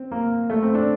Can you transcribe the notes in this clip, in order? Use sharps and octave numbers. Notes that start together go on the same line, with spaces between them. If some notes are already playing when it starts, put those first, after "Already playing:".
Already playing: C4
A#3
A3
C4
D4